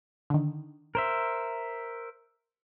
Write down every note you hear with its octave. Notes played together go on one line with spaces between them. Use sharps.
D3 D#3
A#4 C5 E5